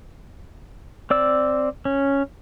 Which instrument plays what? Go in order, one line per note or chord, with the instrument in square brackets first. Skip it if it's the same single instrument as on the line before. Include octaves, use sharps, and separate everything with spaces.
[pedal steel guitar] C4 D5 E6
C#4